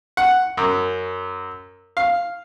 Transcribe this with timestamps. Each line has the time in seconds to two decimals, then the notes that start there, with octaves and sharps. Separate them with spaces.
0.17 F#5
0.57 F#2
1.97 F5